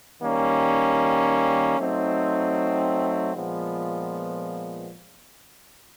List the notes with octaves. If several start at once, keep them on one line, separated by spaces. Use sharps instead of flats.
D#3 G3 A#3 C#4
F#3 A3 C4 D#4
A#2 F3 G#3 B3